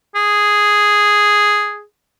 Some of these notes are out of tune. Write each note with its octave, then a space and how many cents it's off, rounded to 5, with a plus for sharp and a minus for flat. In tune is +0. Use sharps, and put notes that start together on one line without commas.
G#4 +0